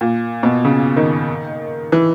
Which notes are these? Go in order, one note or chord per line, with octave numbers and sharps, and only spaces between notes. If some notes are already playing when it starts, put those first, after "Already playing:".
A#2
B2
C#3
D#3
E3